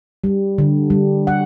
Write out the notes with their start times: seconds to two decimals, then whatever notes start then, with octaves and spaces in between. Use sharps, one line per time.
0.24 G3
0.58 D3
0.90 G3
1.27 F#5